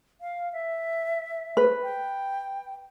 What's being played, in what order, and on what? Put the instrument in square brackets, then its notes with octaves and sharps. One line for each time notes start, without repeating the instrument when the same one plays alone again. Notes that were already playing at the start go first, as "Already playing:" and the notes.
[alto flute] F5
E5
[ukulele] B4
[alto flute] G5